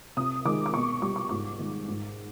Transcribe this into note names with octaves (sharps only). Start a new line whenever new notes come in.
C3 D#6
D#3 G#3 D6
D6
B2 C#6
G3 D6
C#6
G#2 D6
D#3 G#3
G#2